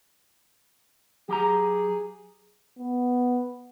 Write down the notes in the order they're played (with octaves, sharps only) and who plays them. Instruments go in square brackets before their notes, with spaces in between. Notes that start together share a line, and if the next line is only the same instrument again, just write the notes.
[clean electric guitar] F#3 G4 A#5 [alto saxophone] G#4
[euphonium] B3